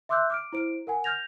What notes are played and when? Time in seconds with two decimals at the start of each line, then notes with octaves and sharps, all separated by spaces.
0.09 E5 C6 D6 E6 F#6 G6
0.30 D6 F6 D7
0.53 E4 C5 D7
0.87 A#4 F#5 G#5
1.04 F6 G6 G#6 A#6 F7